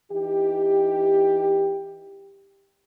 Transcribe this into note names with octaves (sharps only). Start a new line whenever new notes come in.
E3 D#4 G4